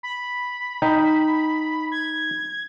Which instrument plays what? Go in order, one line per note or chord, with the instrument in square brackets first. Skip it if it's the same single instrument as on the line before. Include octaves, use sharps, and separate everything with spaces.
[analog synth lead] B5
[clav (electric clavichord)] D#4 G5
[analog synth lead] G#6